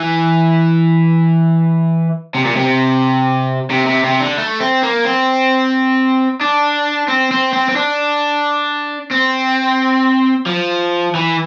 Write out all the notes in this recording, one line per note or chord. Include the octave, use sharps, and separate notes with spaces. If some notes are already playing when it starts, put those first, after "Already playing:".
Already playing: E3
C3
A#2
C3
C3
C3
C3
D3
A3
C4
A#3
C4
D4
C4
C4
C4
C4
D4
C4
F3
E3